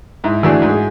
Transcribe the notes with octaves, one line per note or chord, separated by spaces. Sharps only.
G#2 E4
E3 A3 D4 F#4 G#4
G#2
G#4